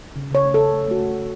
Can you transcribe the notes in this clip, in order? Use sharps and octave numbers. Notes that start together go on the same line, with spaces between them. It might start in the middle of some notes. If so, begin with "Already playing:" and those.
C#3
C#3 C#5
A3
A4
C#3
A3
A3 F#4
A3
A3